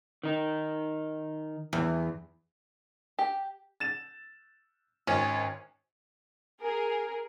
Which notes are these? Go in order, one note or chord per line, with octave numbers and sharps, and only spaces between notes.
D#3 D#4
E2
G4
A6 E7
G#1 C#4
G#4 A#4